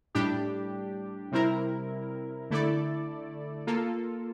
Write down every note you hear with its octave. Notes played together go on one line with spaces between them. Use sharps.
A2 G3 D4 G4
C3 G3 C4 E4 A#4
D3 A3 E4 A4 D5
A#3 F4 A4